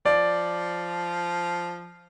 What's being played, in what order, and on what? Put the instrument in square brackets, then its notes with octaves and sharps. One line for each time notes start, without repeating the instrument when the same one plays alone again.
[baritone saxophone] F3 [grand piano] D5